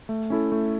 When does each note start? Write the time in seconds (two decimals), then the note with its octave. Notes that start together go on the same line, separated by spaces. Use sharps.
0.09 A3
0.30 C#4 E4 A4
0.52 A3